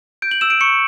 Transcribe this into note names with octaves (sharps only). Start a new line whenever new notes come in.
G6 D7
F#7
E6 E7
D7
C#6 C#7